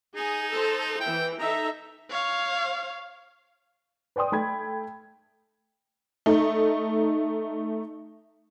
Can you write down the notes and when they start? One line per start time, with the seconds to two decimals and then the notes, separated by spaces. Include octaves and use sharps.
0.16 D#4 G#4 G#5
0.52 A4 C5 A5
1.00 E3 E4 G5
1.40 D#4 A4 E5 A#5
2.10 C#5 F5
4.16 B4 D5 G5 C6 D#6
4.32 A3 G5 B5 G#6
6.26 A3 D#4